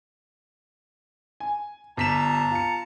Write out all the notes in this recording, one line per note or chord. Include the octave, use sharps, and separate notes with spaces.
G#5
G1 A5 A#5 B6 E7
F4 C#7